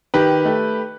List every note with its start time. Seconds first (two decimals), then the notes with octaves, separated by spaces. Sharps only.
0.14 D#3 G4 B4
0.45 A3